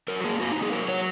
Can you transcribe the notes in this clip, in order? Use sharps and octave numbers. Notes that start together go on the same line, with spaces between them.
F#3 A#4
A#3 G#4
A#3 F#4
D#4
A#3
G#4
F#3 A#4
F#3 C#5